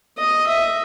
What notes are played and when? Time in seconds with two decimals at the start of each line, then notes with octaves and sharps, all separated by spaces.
0.18 D#5
0.47 E5